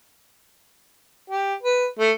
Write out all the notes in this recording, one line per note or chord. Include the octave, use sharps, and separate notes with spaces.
G4
B4
A3